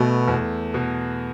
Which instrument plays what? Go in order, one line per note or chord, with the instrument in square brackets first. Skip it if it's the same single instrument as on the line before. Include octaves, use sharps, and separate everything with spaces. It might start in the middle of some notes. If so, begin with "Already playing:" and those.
Already playing: [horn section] B2 [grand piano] A3
[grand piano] E2
B2